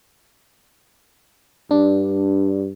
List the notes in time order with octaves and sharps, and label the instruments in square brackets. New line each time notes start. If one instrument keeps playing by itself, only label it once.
[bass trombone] G2 [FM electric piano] D4